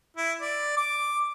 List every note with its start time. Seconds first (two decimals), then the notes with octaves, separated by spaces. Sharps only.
0.17 E4
0.41 D5
0.77 D6